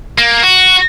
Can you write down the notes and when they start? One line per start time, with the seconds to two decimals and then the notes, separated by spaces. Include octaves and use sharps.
0.18 A#3
0.43 F#4